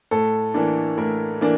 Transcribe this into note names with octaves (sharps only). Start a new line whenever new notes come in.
A2 A4
E3 A#3 D4
A2 A#4
E3 A#3 D4